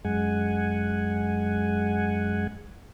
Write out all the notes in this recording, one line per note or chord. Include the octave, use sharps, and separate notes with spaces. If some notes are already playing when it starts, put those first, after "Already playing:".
F#2 G#3 F#5 G#5